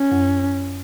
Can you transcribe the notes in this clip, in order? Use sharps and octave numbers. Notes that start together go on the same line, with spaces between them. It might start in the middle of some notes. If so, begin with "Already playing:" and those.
Already playing: C#4
F#2